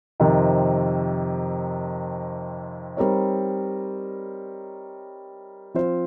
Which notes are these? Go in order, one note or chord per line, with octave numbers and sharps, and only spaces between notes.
F2 C3 D#3
G3 C4 D#4 A#4 C#5
F3 C4 F4 C5